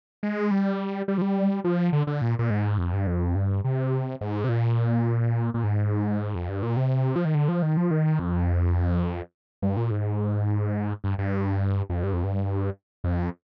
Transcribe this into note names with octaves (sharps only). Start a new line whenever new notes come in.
G#3
G3
G3
F3
G3
F3
D3
D3
A#2
A#2
G#2
F2
G2
F2
G2
C3
G#2
C3
A#2
A#2
G#2
F2
G2
A#2
C3
F3
D#3
D3
F3
D#3
F3
D#3
F2
G2
A#2
G#2
G2
G2
F2
G2
F2
G2
F2